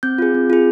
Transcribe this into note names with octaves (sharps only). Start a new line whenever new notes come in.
C4 G6
F4 G#4
C4
F4 G#4